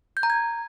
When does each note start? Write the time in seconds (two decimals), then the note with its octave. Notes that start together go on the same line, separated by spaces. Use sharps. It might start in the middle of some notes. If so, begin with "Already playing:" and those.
0.17 G6
0.23 A#5
0.30 G#6